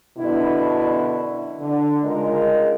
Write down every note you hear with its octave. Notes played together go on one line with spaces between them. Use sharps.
F#2 B2 D3 D4 E4
D3
C#3 G#3 D#4 F4 A#4 D#5